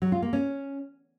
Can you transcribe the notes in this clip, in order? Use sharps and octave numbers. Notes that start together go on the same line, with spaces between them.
F#3
F4
A#3
C#4